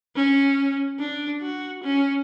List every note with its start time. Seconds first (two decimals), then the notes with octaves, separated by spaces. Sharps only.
0.16 C#4
0.99 D4
1.42 F#4
1.83 C#4